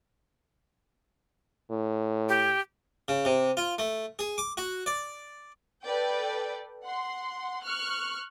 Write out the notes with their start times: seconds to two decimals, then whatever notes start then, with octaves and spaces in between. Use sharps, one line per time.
1.71 A2
2.29 G4
3.08 C#3
3.25 C3
3.57 F4
3.78 A3
4.19 G#4
4.38 D6
4.57 F#4
4.86 D5
5.84 A4 B4 D5 G5
6.85 F#5 C6
7.64 C#6 F6 F#6